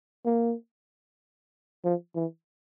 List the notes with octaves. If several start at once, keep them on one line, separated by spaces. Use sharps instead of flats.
A#3
F3
E3